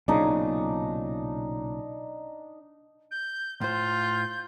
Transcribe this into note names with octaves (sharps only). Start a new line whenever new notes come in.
B1 A#2 C#3 D4 D#4
G6
A2 F4 C5 G6